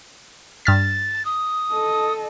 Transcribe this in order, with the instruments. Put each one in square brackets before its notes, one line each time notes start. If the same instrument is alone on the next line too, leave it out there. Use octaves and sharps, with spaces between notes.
[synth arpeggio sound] G2 F6 B6 [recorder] A6
[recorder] D#6
[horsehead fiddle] A4 D#5